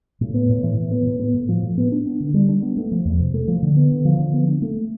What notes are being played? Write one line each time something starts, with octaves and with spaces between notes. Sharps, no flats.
A2
B3
A2
E3
A2
B3
A2
B3
A2
F3
A2
B3
D4
B3
D3
G3
D4
B3
A3
F3
E2
C3
A3
F3
D3
B3
D3
F3
D3
B3
D4
A3